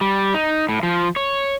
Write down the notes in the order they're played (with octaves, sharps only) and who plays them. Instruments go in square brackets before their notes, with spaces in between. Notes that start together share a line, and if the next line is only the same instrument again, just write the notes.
[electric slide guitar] G3
D#4
A2
F3
C#5